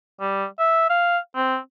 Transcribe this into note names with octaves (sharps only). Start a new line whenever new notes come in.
G3
E5
F5
C4